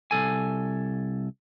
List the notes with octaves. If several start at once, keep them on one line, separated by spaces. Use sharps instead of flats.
C2 A4 G#5